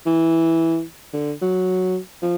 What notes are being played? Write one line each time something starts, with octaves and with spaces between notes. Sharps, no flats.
E3
D3
F#3
F3